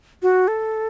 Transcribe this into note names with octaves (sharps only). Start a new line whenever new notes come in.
F#4
A4